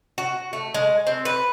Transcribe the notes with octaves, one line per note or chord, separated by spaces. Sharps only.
F#4
A3
G#3
C4
B4